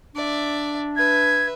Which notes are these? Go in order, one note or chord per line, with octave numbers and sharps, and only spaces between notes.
D4 D5 E5
B4 E5 G#6